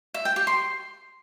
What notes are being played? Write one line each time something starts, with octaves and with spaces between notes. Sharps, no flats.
E5
G5
G4
C6